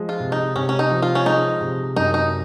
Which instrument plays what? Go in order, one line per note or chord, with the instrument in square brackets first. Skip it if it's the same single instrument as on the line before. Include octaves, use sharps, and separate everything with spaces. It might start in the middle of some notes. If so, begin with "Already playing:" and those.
Already playing: [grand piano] F3 G#3
[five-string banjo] F4
[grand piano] C3
[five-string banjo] D#4
[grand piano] C3 [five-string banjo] C#4
[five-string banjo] C#4
D#4
[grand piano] F3
[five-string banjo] F4
C#4
[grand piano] G#3 [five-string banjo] D#4
[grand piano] C3
[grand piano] F#2 [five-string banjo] D#4
[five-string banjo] D#4